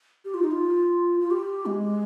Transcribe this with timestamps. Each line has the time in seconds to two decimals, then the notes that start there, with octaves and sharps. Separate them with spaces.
0.25 G4
0.34 F4
0.42 D#4
0.51 F4
1.20 F4
1.31 G4
1.66 G#3